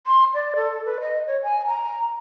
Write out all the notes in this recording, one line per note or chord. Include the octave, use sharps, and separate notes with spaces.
C6
D5
A4
B4
D#5
C#5
G#5
A#5